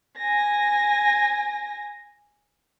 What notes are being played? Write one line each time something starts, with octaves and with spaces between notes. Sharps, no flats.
G#5 A#6